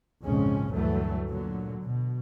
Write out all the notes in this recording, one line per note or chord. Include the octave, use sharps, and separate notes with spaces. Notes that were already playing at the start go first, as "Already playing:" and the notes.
A#1 F2 G#2 C#3 G#3 C#4
D2 G2 E3 F#3 A3
A#2 D3 F#3
B2